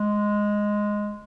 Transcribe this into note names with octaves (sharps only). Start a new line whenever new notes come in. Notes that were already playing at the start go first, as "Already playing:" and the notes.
Already playing: G#3